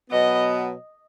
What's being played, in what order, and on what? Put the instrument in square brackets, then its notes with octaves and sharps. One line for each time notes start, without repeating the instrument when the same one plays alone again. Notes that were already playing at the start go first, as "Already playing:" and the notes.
[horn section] B2 F#3 B3 [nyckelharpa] D#5